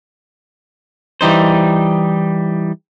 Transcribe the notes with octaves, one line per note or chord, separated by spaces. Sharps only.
E3 G3 D#4 C5